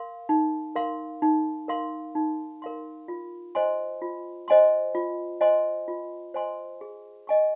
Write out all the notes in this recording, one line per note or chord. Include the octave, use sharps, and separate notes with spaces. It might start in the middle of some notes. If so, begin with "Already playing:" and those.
Already playing: A#4 F5 C6
D#4
A#4 F5 C6
D#4
A#4 F5 C6
D#4
A#4 F5 C6
F4
C5 D#5 G#5 C6
F4
C5 D#5 G#5 C6
F4
C5 D#5 G#5 C6
F4
C5 D#5 G#5 C6
G#4
D#5 G#5 C#6